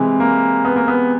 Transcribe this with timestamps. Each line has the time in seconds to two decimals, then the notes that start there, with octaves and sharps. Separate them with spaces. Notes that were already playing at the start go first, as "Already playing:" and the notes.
Already playing: C3 E3 G#3
0.20 A#3
0.65 B3
0.76 A#3
0.88 B3